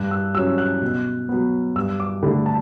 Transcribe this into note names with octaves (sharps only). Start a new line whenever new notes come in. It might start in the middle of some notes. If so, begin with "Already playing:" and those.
Already playing: G2 F#6
E6
F#3 C#4 E6
F#6
B2
F#3 B3
G2 E6
D6
D3 A3 D4 B5
A5